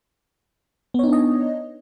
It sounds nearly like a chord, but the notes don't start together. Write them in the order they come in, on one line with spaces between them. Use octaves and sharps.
B3 C#5 D#4 D4 D#5